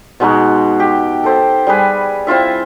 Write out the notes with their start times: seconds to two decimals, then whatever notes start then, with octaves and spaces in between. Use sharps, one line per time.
0.20 B2 G#3 D#4 F#4
0.80 G4
1.24 A4 C5 E5
1.67 G3 G#4 B4 G#5
2.27 C4 E4 F4 E5